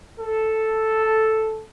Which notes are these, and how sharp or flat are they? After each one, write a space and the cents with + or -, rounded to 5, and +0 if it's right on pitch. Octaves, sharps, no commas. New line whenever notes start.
A4 +0